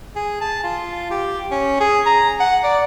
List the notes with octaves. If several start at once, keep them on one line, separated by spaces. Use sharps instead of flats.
G#4
A5
F4
G4
C#4
G#4
A#5
F#5
D5